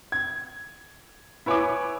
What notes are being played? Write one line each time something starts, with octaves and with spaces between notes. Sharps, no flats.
G#6
E4 B4 C#5 G#5 B5 D6